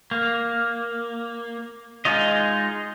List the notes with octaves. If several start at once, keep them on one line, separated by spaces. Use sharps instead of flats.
A#3
G#3 D#4 F4 D#5